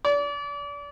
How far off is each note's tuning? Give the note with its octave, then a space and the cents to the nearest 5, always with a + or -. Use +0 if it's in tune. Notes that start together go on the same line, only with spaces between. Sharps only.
D5 -35